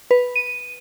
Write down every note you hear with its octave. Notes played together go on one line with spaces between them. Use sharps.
B4
D#7